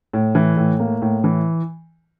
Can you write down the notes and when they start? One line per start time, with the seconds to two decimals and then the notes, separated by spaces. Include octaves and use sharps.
0.13 A2
0.35 E3
0.57 A2
0.80 A#3
1.02 A2
1.24 E3